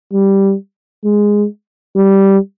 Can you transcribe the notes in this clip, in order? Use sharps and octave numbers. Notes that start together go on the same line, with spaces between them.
G3
G#3
G3